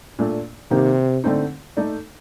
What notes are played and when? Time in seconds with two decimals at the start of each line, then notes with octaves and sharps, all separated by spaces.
0.19 A#2 A3 D4
0.70 C3 D#3 A#3 D#4 G4
1.24 D3 A3 C4 D#4
1.77 A3 D#4 A4 D5